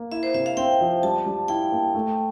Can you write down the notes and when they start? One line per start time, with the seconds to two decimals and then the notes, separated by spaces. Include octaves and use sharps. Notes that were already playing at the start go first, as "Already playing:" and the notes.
Already playing: A#3
0.12 E4 E5
0.23 C5
0.34 C3 E5
0.46 F5
0.57 C4 G5
0.81 F3
1.03 G3 A5
1.26 G3
1.48 E4 G5
1.72 A#3
1.95 A3